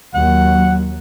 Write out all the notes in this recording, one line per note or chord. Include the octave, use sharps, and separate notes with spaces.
D#2 F#3 F#5